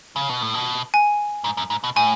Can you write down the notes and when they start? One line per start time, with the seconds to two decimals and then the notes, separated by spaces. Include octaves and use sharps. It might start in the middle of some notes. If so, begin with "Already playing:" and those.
0.16 C#3
0.30 B2
0.42 A2
0.54 B2
0.94 G#5
1.44 G#2
1.57 F#2
1.70 G#2
1.84 B2
1.96 A2 G#5